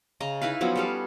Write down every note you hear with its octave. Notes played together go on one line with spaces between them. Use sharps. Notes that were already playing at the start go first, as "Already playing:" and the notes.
C#3 D#5 A#5
D#4 E4 B4 F5
F3 F#3 B3 C#4
G3 A4 F5